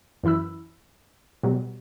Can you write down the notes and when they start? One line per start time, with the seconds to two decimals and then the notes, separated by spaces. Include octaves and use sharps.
0.23 F#2 E3 E4 B5 E6
1.43 B2 F#3 G3